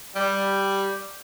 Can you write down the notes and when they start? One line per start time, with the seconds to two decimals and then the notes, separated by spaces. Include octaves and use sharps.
0.15 G3